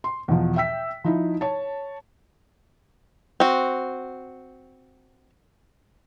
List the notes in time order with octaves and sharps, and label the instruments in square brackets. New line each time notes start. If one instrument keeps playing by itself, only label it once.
[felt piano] C6
E2 B2 F3
E5 G5 E6 B6
F3 D#4 E4
C#5 A5
[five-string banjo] C4 F#4